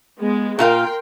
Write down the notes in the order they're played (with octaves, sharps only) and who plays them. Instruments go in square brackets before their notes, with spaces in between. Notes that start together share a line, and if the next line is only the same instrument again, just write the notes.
[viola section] G#3 B3
[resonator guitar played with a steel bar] A#2 F4 F5 [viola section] A#4 G5 C6